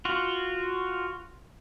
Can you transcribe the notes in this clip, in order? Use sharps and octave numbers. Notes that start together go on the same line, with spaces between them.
F4 F#4